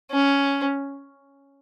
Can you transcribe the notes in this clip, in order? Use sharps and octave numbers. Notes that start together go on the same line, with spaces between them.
C#4